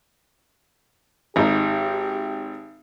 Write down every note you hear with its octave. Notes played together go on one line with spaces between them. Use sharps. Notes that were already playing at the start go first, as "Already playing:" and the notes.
G#1 D#4 G4